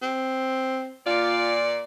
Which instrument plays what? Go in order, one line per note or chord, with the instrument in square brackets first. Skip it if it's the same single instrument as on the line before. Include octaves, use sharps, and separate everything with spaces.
[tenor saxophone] C4
[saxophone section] A#2 D5 [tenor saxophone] F4